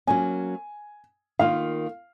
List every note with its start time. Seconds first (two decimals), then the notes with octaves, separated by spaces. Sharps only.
0.07 F#3 A#3 C#4 G#5
1.39 D#3 A#3 F4 F5